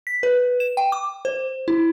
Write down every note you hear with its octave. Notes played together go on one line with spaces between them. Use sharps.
B6
B4
E7
G5
D6
C5
E4